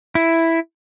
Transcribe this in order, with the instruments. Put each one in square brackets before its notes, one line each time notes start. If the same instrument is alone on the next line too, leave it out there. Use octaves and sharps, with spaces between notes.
[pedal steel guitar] E4